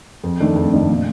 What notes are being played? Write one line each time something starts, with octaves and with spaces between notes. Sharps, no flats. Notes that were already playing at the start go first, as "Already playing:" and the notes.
F2
D#3 A3 D4
F2
D#3 A3 D4
A#2